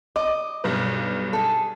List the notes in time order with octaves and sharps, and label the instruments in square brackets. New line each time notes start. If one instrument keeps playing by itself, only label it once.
[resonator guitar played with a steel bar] D#5 [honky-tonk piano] D6
[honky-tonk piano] B1 G2 B4
[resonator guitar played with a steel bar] G#4 A4